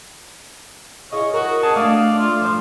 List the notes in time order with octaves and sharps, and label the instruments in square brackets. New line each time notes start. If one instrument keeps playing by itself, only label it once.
[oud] E4 G#4 F5 [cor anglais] C#5 [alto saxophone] D#5
[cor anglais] F#4 [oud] A#4
[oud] C#4 [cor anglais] G#4 [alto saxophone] A5
[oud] A3 D4 [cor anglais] D5 [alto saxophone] F5
[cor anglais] F4
[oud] G2 C5 [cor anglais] F3